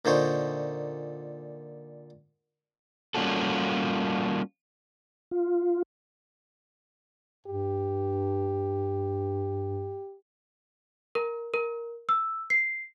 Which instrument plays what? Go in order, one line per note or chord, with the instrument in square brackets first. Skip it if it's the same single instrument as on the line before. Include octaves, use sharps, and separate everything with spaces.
[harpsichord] A#2 D3 D#4 C5 C#5
[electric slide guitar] G3 A#3 C#4 F4 F#4 A4
[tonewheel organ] F4
[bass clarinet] G2 [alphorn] G4
[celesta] A#4
A#4
E6
C7